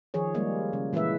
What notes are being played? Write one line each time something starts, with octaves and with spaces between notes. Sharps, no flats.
D#3 F3 G#4 C#5
G3 G#3 A#3
C#3
A#2 E3 G#3 E4 B4 E5